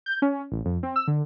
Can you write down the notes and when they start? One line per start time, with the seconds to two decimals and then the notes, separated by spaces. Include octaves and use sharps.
0.06 G6
0.22 C#4
0.52 A1
0.65 F2
0.83 C4
0.96 E6
1.07 D3